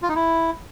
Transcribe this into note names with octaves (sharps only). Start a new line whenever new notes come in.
F4
D#4
E4